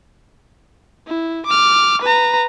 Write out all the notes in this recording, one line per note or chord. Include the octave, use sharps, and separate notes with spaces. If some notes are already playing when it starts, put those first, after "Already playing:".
E4
D6 F6
B4 A#5